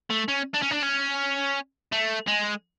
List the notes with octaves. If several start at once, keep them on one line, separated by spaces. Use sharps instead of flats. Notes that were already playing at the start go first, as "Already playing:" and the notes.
A3
C#4
D4
C#4
D4
C#4
A3
G#3